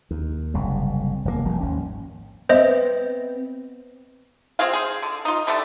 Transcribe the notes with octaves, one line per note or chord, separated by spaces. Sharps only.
D#2
F#1 C2 G#2
F1 D#2 B2 A#3
F1 F3 G3 A#3
G#1 D#2 C#4
B3 C4 C5 D#5 E5
C4 F4 G#4 F5
G#4 C5
D3
D#4 F4
D3 G3 A3 A4